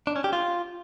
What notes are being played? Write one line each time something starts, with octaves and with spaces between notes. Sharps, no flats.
D4
C#4
G4
F4